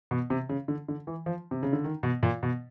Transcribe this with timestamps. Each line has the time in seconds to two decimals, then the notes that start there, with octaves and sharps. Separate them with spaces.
0.11 B2
0.30 C3
0.49 C#3
0.68 D3
0.88 D3
1.07 E3
1.26 F3
1.51 C3
1.63 C#3
1.73 D3
1.84 D#3
2.03 B2
2.23 A#2
2.43 B2